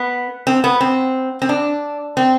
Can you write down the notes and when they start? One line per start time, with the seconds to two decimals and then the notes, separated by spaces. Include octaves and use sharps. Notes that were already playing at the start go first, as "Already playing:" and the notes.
Already playing: B3
0.47 C4
0.64 B3
0.81 C4
1.42 C4
1.49 D4
2.17 C4